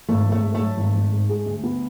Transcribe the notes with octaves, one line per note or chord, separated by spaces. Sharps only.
G#1 A3
G#1
A3
G#2
A3
F#3
G#1
G#1
G#2
G#3
D2
B3